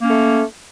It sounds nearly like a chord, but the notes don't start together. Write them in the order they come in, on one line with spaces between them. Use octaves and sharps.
A#3 C#4 A3